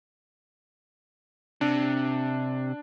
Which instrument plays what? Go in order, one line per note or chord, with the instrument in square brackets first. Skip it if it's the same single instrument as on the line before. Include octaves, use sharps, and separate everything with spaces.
[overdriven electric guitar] C3 [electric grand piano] D4